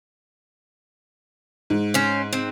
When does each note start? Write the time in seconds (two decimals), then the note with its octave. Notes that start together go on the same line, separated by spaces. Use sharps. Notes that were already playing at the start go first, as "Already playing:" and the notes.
1.70 G#2
1.94 C#4 C5
2.33 C4